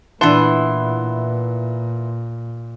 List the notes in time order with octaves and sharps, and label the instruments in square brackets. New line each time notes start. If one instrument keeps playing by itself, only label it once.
[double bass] A#2 [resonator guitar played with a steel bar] E3 B3 E4 [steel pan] D4 A5 [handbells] B4 C6